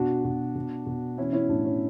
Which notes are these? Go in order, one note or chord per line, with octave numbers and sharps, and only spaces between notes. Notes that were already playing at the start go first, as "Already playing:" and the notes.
Already playing: B2 D4 F#4
B2
B2
B2
E3 C#4 E4
C#4 E4
A2 D4
C#4